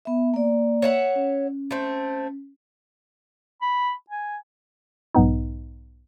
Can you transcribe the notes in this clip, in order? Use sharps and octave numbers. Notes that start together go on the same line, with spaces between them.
B3 E5
A#3 D5
C#5 E5 F#5
C#4
A3 C4
B5
G#5
B1 G#2 B3 D#4